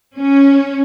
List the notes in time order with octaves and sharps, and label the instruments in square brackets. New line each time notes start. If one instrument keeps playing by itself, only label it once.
[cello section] C#4